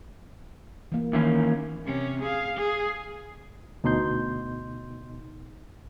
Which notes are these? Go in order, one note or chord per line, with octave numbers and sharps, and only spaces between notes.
E3 A#3
D#3 E3 A#3 C#4
C3 C#4
G#4 F5
G#4
D2 B2 D#4 C6 G6